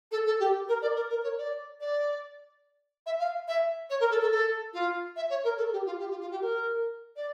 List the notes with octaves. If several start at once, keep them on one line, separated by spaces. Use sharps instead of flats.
A4
A4
G4
A#4
D5
A#4
A#4
C#5
D5
D5
E5
F5
E5
C#5
A#4
A4
A4
A4
F4
E5
C#5
A#4
A4
G4
F4
G4
F4
F4
G4
A#4
D5